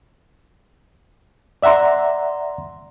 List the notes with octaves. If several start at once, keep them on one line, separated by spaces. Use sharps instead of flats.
D5 E5 F#5 A#5 C6